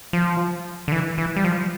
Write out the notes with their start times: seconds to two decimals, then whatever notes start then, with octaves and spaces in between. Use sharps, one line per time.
0.13 F3
0.88 D3
0.92 E3
1.18 E3
1.36 G3
1.44 F3